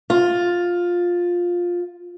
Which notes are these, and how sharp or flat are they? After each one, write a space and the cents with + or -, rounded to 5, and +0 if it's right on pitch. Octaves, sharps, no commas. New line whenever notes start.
F4 +10